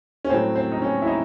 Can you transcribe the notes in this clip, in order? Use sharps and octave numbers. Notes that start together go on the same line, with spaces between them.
C#4
A2 F#3 C4
C4
D#4
C#4
E4
D#4